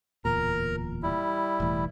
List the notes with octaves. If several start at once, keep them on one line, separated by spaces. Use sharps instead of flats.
D1 E2 A#2 A#4 A#5
G3 E4
E1 A2 E3